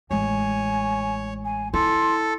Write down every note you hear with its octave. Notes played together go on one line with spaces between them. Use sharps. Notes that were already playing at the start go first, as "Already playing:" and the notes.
A1 G#3 C#5 G#5
G#5
E4 A4 C6